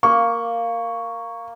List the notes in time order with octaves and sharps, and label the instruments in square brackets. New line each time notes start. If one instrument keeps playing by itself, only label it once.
[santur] A#3 [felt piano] C#6